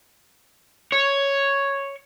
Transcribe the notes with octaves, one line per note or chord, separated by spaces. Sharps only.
C#5